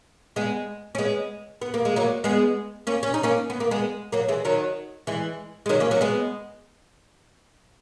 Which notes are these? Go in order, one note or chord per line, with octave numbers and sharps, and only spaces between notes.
G#3 B3
C#4
G#3 B3
B3
A#3
G#3
F#3 A#3
G#3 B3
A#3 C#4
C#4
D#4
A#3 C#4
B3
A#3
G#3 B3
F#3 A#3
E3 G#3
D#3 F#3
E3 G#3
G#3
D#3 F#3
A#3 C#4
F#3 A#3
G#3 B3